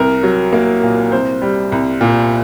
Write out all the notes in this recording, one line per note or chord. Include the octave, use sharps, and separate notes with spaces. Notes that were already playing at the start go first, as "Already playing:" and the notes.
Already playing: C2 A#4
F#3
A#3
A#2
C2 C5
G3
C2
A#2